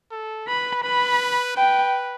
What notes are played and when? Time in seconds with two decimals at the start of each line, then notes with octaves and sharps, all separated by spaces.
0.11 A4
0.47 B4 B5
0.83 B4 B5
1.57 B4 G5